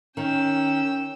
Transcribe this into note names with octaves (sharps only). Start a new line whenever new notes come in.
D#3 C#4 G5 E6